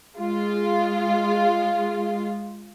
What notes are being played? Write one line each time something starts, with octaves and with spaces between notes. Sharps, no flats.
G#3 F4